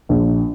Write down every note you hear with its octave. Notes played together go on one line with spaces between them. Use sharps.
A#1